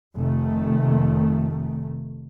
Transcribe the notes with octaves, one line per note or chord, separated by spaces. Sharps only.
F1 D#3 A3